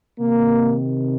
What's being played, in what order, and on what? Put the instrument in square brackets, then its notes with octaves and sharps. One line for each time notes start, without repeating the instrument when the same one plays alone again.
[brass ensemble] C3 D#3 A#3